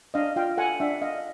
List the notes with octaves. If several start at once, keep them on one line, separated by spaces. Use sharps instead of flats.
D4 D#5 F5
F4 F5 G5
A4 F#5 G#5
D4 E5 F#5
D4 D#5 F5